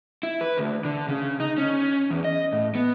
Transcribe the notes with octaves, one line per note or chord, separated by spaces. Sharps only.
E4
B4
D2
D3
C#3
D#4
C#4
E2
D#5
A2
B3